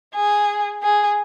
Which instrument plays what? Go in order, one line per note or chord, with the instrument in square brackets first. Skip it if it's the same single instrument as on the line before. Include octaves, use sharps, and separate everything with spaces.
[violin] G#4
G#4